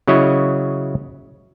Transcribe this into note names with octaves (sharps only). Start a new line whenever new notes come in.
C#3 F#3 E4 C#5 D#5